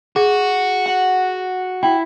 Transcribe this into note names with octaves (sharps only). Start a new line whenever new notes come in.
F#4 G#4
F#5
E4 G5